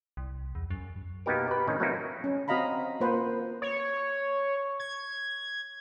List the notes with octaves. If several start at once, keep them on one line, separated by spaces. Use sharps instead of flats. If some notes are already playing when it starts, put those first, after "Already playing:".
C2
E2
F#2
B2 A#3 B3 D#4 G4 A#4
G4 B4
A2 C3 D#3 C#4 D#4
F#3 A3 A#3 C4 D#4 E4
C#4
C4 F#4 D#5 F5 A#5 B5
A#3 F4 B4 C5 F#5
C#5
G#6